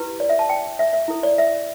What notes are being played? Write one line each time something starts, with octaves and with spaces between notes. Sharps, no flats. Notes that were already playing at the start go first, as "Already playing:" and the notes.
Already playing: E4 G4 B4
D5
E5
A5
G5
E5
E5
E4 A4
D5
E5